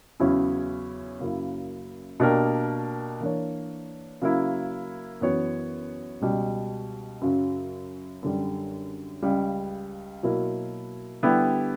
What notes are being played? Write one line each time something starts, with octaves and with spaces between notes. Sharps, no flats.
E2 C#3 F#3 C#4 E4
F#2 C#3 F#3 A#3 E4
B2 A#3 D4 G4 A#4
E3 A#3 D4 A#4 C#5
C#3 F#3 A#3 E4
F#2 E3 B3 F#4 C#5
C#2 B2 G3
F#2 C#3 F#3
F#2 D3 G3
C#2 C#3 G3
B2 F#3 A#3 E4 A#4
D3 G3 B3 E4 G4